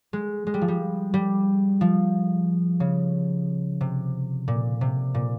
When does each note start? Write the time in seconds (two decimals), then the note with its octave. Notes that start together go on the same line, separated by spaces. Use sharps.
0.13 G#3
0.47 G#3
0.54 G3
0.61 F3
0.68 G3
1.14 G3
1.81 F3
2.80 C#3
3.81 C3
4.48 A#2
4.81 C3
5.14 A#2